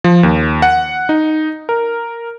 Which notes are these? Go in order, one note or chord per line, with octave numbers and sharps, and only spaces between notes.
F3
D#2
F#5
D#4
A#4